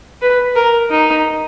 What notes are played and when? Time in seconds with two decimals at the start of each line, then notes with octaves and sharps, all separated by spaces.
0.22 B4
0.56 A#4
0.91 D#4